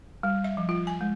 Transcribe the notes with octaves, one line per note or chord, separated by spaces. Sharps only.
G3
E5
F3
F4
G#5
G#3